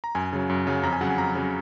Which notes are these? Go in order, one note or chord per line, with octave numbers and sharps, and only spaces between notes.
A#5
F#2 G#5
C#3 F#3
F#2
C#3 F#3
F2 A#5
G#5
C#3 F#3 F#5
G#5
F2 A#5
C#3 F#3